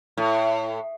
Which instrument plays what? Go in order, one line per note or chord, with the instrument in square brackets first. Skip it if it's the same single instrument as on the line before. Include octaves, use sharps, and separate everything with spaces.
[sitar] A2